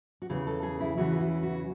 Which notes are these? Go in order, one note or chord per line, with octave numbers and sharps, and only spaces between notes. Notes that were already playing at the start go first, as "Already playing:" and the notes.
F#4
E2 C#3 E3 G#4
A4
G#4
E4
E2 C#3 E3 F#4
E4
F#4